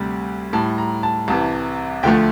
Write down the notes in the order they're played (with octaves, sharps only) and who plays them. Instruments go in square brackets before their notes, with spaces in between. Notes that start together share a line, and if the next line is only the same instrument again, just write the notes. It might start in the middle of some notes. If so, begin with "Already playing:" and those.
Already playing: [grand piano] D2 C3 G3
A2 G3 A5
A#5
A5
C2 C3 E3 A5
D2 D3 F3 A3 G5